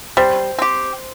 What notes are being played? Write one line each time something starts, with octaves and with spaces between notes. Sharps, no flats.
G3 C5
C4 G4